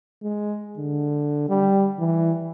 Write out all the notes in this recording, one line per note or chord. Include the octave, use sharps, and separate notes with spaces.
G#3
D3
G3
E3